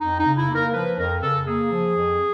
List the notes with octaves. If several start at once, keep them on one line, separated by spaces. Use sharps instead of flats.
F2 D#4
D#4
C#3
E4
A#3
A#4
F3 B4
F2 A#4
C#3 A4
A#3 G#4
F3
F2